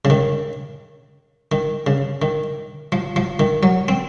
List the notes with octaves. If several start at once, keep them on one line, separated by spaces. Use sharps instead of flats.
C#3
D#3
D#3
C#3
D#3
F3
F3
D#3
F#3
C4